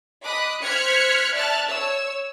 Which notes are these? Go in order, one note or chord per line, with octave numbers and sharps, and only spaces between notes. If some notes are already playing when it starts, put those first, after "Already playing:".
D#5 B5 D6 D#6 F#6
C5 F6 F#6 G#6 B6 C#7
D5 E5 A5 F6 F#6 A6
C#5 E6